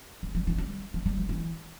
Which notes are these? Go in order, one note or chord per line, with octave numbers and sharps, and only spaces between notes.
G3
F3
E3
G3
F3
G3
F3
E3